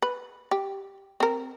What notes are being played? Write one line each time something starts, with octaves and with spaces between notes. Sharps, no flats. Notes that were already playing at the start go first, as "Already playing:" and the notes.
B4
G4
C4 A#4